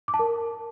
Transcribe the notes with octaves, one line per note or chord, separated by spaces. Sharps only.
D6
A5
A#4